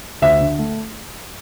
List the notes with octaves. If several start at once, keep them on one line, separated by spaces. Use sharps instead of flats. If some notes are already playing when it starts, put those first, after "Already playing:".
D2 E5
D3
A3